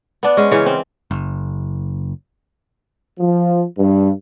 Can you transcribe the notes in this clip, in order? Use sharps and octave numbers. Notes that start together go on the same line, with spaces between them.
B3 D4
G#3 C#4
C#3 E3 C#5
C4
F#1
F3
G2